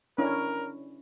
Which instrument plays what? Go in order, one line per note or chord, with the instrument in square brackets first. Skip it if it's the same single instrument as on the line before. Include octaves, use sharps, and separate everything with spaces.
[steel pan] C#4 D4 E4 [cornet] A#4